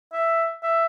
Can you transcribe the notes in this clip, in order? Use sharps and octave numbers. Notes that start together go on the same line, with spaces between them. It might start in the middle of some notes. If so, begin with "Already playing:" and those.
E5
E5